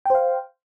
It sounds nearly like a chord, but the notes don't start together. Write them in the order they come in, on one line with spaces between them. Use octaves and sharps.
G5 C5 F5